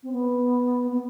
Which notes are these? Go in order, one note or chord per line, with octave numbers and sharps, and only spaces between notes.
C4
B3
B3